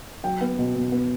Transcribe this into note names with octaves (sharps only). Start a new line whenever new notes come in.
F#3 G5
B3
B2
B2
B3